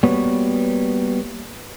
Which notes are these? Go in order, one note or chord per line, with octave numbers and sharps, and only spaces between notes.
G3 A#3 B3 F#4 B4 C#5